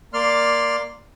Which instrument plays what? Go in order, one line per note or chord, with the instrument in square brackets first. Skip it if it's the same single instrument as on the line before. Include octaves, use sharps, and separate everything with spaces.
[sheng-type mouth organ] A#3 D5 C6 F6